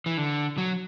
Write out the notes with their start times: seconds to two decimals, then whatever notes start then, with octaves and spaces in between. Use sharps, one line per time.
0.06 E3
0.17 D3
0.58 F#3